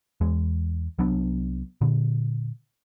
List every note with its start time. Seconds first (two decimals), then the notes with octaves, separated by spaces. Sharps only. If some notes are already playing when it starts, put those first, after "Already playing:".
0.21 E2 G#3
0.99 C2 F#3 B3 D4
1.81 A#2 D3